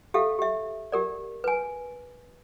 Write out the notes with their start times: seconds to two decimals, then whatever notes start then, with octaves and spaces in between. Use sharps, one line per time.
0.14 G4 A4 E5 F5
0.39 G4 E5
0.92 G4 A#4 D5
1.44 B4 G#5